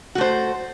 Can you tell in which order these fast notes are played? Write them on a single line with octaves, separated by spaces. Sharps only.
F#4 A3 C5